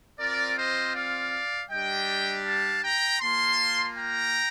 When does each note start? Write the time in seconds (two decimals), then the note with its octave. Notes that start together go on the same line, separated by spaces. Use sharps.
0.19 C4 F4 A#4 D5
0.57 C5 D#5
0.95 D5 F5
1.71 G3 D4 G4 D#5 G5
2.46 F5 A5
2.83 G5 A#5
3.21 A#3 F4 A5 C6
3.97 G5 A#5